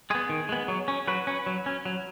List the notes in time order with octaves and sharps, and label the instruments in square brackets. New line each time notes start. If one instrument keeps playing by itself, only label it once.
[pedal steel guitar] G#3 B3 G#4
D#3
G#3 B3
F#3
C#4
F#3 B4
C#4
F#3
C#4
F#3